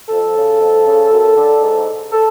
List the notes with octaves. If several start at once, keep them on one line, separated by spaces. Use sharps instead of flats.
F2 A4
C#3
F2
C#3
F#2
D3
G#2
A4